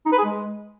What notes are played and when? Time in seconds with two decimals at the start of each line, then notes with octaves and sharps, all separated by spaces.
0.06 D#4
0.12 B4
0.18 G#4
0.25 G#3